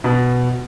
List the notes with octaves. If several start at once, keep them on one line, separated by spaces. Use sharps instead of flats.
B2